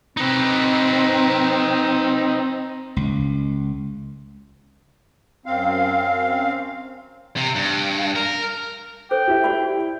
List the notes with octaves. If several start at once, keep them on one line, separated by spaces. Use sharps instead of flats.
C4 D#4 B4
C#2
F#2 C4 F5
C3
G2
A#4
A4 C5 G5
E4 G4
F#4 D5 B5